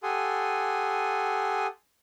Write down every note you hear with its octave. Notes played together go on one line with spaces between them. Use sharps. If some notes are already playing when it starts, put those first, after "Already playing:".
G4 A4 F#5 G#5 C6 D#6